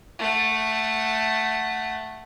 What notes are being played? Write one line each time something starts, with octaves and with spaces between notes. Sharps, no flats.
A3 F#5